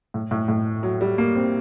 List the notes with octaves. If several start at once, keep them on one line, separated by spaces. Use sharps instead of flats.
A2
A2
A2
F#3
G3
A#3
C4